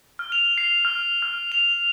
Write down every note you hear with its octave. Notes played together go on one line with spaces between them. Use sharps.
F6
F7
C7
F6
F6
F7